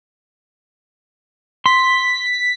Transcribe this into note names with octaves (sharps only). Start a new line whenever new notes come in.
C6 B6